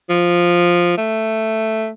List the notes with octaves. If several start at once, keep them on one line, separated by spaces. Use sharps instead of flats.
F3
A3